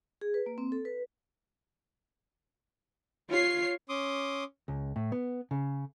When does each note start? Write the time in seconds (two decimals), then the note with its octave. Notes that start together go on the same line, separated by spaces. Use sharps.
0.21 G#4
0.34 B4
0.46 A#3
0.58 C4
0.72 A4
0.85 B4
3.30 F4 C#5 C7
3.89 C#4 C6 D6 D#6
4.68 C#2
4.96 A2
5.12 B3
5.51 C#3